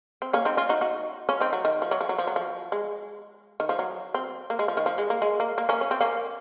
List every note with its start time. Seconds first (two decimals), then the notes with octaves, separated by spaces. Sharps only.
0.22 C4
0.33 A#3 C#4
0.45 C4 D#4
0.57 C#4 F4
0.69 D#4 F#4
0.81 D#4 F#4
1.29 C#4 F4
1.40 C4 D#4
1.53 F#3
1.65 D#3
1.82 F3
1.91 F#3
2.01 F3
2.09 F#3
2.18 F3
2.27 F#3
2.36 F3
2.72 G#3
3.60 D#3
3.69 F3
3.79 F#3
4.14 C4
4.50 A#3
4.59 G#3
4.68 F3
4.77 D#3
4.86 F3
4.98 G#3
5.10 A#3
5.22 G#3
5.40 A#3
5.58 A#3
5.69 A#3 C#4
5.81 C#4
5.91 C4
6.01 A#3 C#4